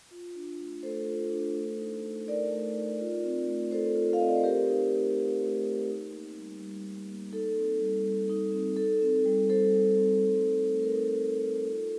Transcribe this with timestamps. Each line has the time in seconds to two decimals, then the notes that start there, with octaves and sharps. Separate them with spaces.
0.11 F4
0.35 D4
0.59 A3
0.83 A3 A4 C5
1.08 F4
1.32 D4
1.55 A3
1.79 D#4
2.04 A3
2.28 D#4 A#4 D5
2.51 A3
2.76 D#4
3.00 F4
3.24 C4
3.47 A3
3.71 A3 A4 C5
3.95 F4
4.13 F5
4.20 C4 D#5
4.29 D5
4.36 C5
4.43 A3 G4 A#4
4.68 D#4
4.92 A3
5.16 D#4
5.40 A3
5.64 D#4
5.88 D#4
6.13 A#3
6.37 G3
6.61 G3
6.84 D#4
7.09 A#3
7.32 D#4 A4
7.56 C4
7.81 G3
8.04 G3
8.29 D#4
8.53 C4
8.77 D#4 A4
9.01 C4
9.26 G3
9.49 G3 A4 C5
9.74 D#4
9.97 C4
10.21 A3
10.45 D#4
10.69 A3
10.83 A#4
10.94 D#4 A4
11.17 A3
11.42 D#4
11.66 F4